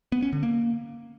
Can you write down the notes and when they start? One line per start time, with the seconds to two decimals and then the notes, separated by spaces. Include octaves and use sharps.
0.12 B3
0.22 C#4
0.33 D3
0.43 A#3